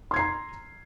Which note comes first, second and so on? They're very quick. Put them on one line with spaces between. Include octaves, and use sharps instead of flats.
C6 G#6 C7 A#5